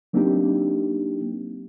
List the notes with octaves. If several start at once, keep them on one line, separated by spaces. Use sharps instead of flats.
F#3 A#3 C4 D4 D#4 G4